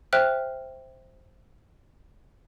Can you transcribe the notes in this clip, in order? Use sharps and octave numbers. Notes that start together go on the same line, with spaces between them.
C5 E5 G5 F6 F#6